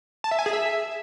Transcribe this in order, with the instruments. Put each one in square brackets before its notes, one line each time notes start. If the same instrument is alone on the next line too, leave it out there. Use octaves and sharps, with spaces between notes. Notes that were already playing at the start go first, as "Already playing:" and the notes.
[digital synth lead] A5
E5
G#5
G#4
E5